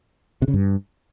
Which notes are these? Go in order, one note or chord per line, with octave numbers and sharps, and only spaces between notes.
C3
C#3
G2